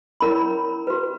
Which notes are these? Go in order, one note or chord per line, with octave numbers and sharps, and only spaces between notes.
C#4 E4 A#4 C#5 B5
F#4 B4